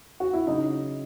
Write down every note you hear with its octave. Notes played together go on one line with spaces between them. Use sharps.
F#4
E4
C#3 F#3 D#4